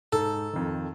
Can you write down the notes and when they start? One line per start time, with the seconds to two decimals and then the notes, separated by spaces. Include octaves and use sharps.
0.13 G#2 A4
0.53 F2 D#3